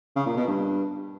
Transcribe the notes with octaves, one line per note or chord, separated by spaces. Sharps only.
C#3
A#2
B2
G2